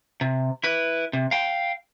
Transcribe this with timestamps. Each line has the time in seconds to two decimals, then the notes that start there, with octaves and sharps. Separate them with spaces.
0.21 C3
0.64 E4 B4
1.13 C3
1.31 F5 G5